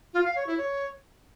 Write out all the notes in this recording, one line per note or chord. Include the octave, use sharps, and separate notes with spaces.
F4
F5
C#5
E4
C#5